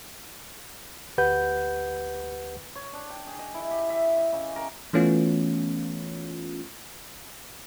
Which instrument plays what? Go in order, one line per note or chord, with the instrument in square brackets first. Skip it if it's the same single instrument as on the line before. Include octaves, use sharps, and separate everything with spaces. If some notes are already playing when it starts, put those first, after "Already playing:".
[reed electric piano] D2 G4 B4 F#5 G6
[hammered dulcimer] C#5
D4
G5
G#4
D#5
E4
G4
E5
D#5
C#3
A#4
[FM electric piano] E3 A3 B3 C#4 F4